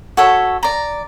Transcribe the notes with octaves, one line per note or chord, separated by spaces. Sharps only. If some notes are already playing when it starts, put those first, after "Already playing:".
F#4 A4 C#5 E5
D5 A#5